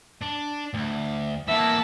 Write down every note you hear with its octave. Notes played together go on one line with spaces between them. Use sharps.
D4
D2
E3 A#3 E5 F#5 A5